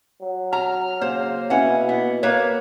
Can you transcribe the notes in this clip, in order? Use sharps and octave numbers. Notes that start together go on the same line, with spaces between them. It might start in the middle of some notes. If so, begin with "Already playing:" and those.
F#3
A#5 F6
C#3 A#3 C5
B2 C#4 E4 F#5
B3
A#3 A#4 B4 C#5